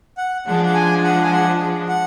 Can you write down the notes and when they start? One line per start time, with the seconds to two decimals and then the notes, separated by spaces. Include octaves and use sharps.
0.18 F#5
0.46 F3 G#3 D4 F#5
0.64 F#5
0.74 G#5
1.03 F#5
1.23 G#5
1.32 F#5
1.89 F#5